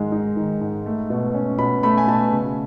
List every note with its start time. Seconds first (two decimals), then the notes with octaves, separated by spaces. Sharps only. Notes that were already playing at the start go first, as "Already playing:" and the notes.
Already playing: G#2 D#3 G#3
0.12 D#4
0.37 D#3
0.61 G#2
0.86 A3
1.10 B2
1.34 C#4
1.59 B2 B5
1.83 A3 B5
1.98 G#5
2.08 B2 A5
2.33 C#3